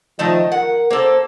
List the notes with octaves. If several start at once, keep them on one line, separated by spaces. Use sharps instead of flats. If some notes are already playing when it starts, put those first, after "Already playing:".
D#3 F3 A3 D#5
A#4 F#5
A#3 A4 C5